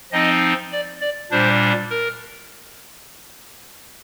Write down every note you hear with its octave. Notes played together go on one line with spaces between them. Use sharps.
F3 C4 D#4 D#5
D5
D5
A#2 G3 D4 C5
A#4